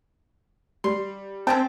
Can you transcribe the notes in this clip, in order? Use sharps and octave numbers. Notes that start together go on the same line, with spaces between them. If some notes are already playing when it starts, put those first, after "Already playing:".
G3 C6
C4 C#4 D#4 G5 A5